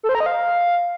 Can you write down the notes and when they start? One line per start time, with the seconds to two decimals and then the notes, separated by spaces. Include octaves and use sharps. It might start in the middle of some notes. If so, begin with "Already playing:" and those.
0.03 A4
0.09 C5
0.15 A#5
0.20 D#5
0.26 F5